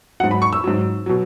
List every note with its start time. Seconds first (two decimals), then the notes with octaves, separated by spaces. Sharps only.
0.20 G#2 F#3 F#5
0.31 B5
0.42 C#6
0.53 E6
0.64 G#2 F#3
1.06 B2 F#3